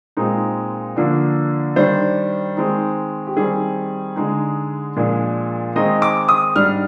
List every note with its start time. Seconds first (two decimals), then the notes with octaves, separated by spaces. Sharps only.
0.17 A#2 G#3 C4 D#4
0.96 D3 F3 A#3 D4
1.76 D#3 G3 D4 C5
2.56 D#3 G#3 C4 D#4
3.27 G4
3.36 D#3 G3 C4 G#4
4.16 D3 G#3 D#4
4.96 A#2 F3 G#3 D4
5.76 D#3 G#3 C4 D#4 D#5
6.02 D6
6.28 D#6
6.56 G#2 G3 D4 F6